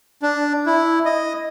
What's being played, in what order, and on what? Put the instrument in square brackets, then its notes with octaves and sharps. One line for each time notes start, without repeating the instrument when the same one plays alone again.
[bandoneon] D4
E4
D#5